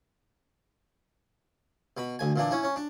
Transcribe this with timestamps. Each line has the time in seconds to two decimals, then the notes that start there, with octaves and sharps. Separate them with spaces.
1.97 B2 B5
2.19 D2 G#5
2.36 A#2 E3 D4
2.51 C#4 E4
2.63 C#4
2.76 D4